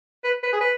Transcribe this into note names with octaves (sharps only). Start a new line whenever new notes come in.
B4
B4
G#4
B4